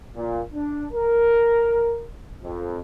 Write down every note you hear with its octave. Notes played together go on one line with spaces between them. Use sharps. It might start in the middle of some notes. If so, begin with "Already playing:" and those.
A#2
D4
A#4
F2